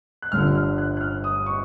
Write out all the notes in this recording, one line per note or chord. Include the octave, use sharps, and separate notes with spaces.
F#6
G1 G2 D3 F3 F6
F6
F#6
F#6
F6
D#6
C#6